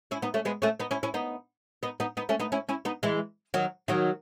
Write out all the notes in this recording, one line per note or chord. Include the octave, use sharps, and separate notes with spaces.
C#4 E4
B3 D#4
A3 C#4
G#3 B3
A3 C#4
B3 D#4
C#4 E4
C#4 E4
B3 D#4
B3 D#4
B3 D#4
B3 D#4
A3 C#4
B3 D#4
C#4 E4
C#4 E4
B3 D#4
E3 G#3
D#3 F#3
D#3 F#3